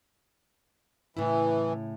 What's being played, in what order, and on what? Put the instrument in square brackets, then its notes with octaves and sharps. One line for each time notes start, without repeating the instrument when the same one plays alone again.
[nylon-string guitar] A2 C#3 E4 [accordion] E3